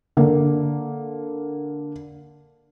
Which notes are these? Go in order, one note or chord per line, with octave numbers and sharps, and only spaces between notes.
D3 A#3